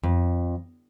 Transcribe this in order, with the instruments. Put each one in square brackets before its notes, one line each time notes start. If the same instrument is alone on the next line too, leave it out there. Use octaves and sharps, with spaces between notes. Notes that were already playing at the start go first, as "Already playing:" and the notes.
[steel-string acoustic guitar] F2